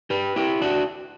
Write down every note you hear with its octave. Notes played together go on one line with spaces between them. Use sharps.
G4 B4
E4 G4
D4 F#4